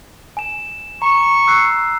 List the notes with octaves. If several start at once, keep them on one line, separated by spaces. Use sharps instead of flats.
G#5 E7
A#5 C#6
E6 F#6 C7